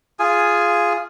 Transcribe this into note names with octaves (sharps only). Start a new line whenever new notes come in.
F4 G#4 G#5